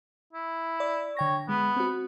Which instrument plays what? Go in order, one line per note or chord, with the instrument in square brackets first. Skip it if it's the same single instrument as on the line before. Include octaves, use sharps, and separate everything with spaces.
[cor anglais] E4
[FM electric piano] D5
[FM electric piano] D3 G5 A#6 [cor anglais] C#5
[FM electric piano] G#3 [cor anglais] B3
[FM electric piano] C4 F#4